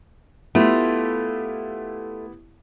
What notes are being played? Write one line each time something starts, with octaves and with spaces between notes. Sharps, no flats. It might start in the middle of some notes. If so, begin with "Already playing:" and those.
A3 B3 E4 F4 G4